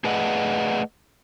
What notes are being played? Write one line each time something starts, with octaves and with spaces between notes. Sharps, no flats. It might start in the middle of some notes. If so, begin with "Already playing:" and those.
A3 G#4 B4 D5 D#5 F#5